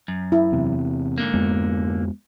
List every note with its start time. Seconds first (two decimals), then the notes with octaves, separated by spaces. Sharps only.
0.08 F#2
0.32 E4
0.52 E2 C3
1.18 G#2 D3 A#3
1.33 F2 G#3 B3